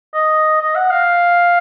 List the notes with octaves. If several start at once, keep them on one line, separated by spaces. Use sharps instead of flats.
D#5
D#5
F#5
F5